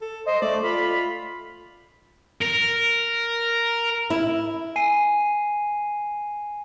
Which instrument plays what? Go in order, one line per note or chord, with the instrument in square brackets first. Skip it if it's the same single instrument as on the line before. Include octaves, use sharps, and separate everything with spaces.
[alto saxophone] A4
[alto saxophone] C5 [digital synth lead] D#5
[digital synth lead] A3 [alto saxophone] D5
[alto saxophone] F4 [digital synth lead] B5
[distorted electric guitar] A#4
[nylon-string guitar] E4
[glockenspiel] G#5 C7 D#7